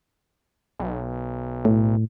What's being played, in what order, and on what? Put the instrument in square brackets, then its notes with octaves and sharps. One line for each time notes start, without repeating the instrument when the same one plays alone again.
[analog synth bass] B1
[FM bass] A2